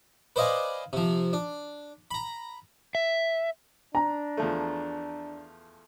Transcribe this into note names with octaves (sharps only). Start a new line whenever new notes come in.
B4 C5 D5 D#5 F5 G#5
C3 F3
D4
A#5 B5
E5
D4 A#5
E2 F3 A3